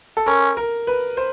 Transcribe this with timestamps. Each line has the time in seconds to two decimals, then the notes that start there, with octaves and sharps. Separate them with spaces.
0.17 A4
0.27 C#4 A#4
0.57 A#4
0.87 B4
1.17 C5